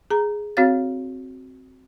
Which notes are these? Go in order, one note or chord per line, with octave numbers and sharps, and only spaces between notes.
G#4 A#5
C4 F#4 C#5 F5 A6